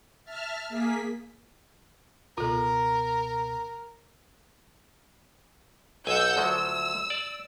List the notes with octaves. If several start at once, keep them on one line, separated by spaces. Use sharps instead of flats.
E5 A5 F6
A#3 G#4 B6
C#2 B2 F4 A4 A#4
B1 F#5 G#5 E6 G6
D2 F3 F#3 E6
D5